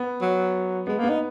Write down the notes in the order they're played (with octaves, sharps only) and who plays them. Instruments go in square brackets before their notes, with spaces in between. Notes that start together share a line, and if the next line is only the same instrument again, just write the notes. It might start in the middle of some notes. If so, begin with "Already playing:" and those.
Already playing: [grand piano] B3
[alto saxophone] F#3
[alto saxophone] G#3 [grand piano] B3
[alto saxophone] A#3
[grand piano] B3
[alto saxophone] D#4